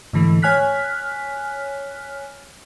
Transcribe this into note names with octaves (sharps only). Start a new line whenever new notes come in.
G#2 D3 E3 A3
C#5 G#5 F6 F#6 B6